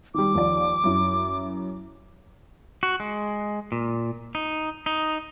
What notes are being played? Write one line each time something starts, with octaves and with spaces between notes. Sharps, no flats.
D#3 G3 D6
D#2 F3 D5
F#2 E4
F#4
G#3
A#2
D#4
D#4